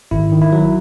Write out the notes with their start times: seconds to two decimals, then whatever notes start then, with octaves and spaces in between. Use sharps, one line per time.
0.11 G#1 E4
0.32 D#3
0.42 E4
0.52 F#3